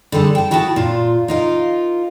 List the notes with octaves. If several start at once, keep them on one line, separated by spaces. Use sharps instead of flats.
D3 G3 G#4 A4
G5 A5
E4 F#4 G#4 G5 A5
A#2 F4
D#4 F4 A#4